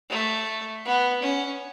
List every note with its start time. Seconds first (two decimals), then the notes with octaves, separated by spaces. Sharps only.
0.10 A3
0.85 B3
1.22 C#4